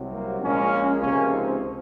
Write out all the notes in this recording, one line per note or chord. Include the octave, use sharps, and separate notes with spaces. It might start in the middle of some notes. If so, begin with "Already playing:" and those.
Already playing: C2 C3 F#3
A#3
A#1 A#2 G#3 A#3 C#4
C#2 C3 F3 A#3 C#4
C4 D#4